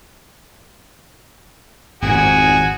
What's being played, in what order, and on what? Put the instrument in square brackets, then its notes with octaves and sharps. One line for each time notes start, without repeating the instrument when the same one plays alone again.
[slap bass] G#1 F2 G#2 [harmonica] F#4 G#4